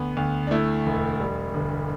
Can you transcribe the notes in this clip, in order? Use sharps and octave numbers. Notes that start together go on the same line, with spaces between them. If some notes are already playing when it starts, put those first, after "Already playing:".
Already playing: D2 B3
D2
D4
A3 E4
E1
G3
G1